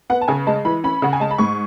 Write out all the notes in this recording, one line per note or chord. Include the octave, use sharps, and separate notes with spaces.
B3 F#5
A5
C#3 G#5
G#3 A5
E3 B5
C#4 B5
C#3 F#5
G#5
G#3 A5
B5
G#2 C#6